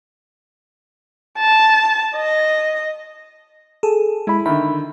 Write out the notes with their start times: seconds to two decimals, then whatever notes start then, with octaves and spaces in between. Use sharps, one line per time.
1.40 A5
2.15 D#5
3.83 G#4 A4
4.27 G#3 E4 B5
4.46 D3 D#3 E5 B5